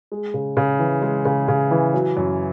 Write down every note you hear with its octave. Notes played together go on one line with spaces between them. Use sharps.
G#3
C#3
C#3
E3
G#3
C#3
C#3
E3
F#3
F#2